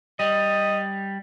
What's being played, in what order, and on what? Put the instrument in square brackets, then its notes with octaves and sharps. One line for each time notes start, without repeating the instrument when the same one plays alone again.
[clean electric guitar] G3 [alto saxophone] D#5